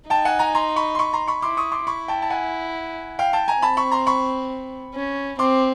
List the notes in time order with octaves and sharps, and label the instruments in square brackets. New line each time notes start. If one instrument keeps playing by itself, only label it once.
[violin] D#4 [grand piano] G5 A5
[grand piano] F#5 G#5
G#5 A#5
A#5 C6
B5 C#6
C6
B5 C#6
A#5 C6
B5 C#6
[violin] E4 [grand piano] C6 D6
[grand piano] C#6 D#6
C6 D6
[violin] E4 [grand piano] B5 C#6
[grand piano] G5 A5
A5
F#5 G#5
F5 G5
G5 A5
G#5 A#5
[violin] C4 [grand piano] A5 B5
[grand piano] B5 C#6
A#5 C6
B5 C#6
[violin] C#4
[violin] C4 [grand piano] C6 D6